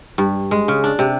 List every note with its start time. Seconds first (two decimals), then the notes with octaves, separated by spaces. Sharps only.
0.18 G2
0.51 G#3
0.68 C#3
0.84 D4
0.99 C3